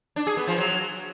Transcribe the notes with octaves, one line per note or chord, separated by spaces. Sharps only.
D4
G#4
B3
F3
F#3